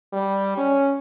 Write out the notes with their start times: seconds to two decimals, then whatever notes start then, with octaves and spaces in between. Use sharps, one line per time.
0.13 G3
0.57 C#4